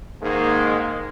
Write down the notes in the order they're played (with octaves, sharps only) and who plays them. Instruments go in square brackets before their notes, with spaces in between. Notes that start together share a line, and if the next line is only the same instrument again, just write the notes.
[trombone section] G#2 D#3 G#3 A#3